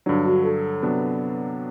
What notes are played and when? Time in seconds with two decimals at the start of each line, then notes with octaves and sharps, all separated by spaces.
0.06 G2 D3 F#3 D4
0.26 F#4
0.44 A4
0.83 C3 F#3 B3 D4